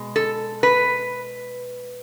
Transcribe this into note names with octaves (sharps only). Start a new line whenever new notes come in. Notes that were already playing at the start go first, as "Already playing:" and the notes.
Already playing: B2 G#3
A4
B4